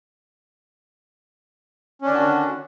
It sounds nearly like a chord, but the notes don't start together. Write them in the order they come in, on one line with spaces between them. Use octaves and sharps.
C#4 D4 D#3 D3 F#4